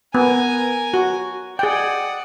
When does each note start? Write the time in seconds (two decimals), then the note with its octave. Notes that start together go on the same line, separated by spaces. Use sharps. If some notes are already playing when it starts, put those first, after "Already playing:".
0.15 B3 A#4 G#5
0.94 F#4
1.59 G#4 D5 F#5 G5